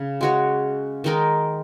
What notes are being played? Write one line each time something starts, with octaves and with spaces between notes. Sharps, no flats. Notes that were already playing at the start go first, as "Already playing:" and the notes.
Already playing: C#3
G#3 F#4 C#5
D#3 G#3 D#4 A#4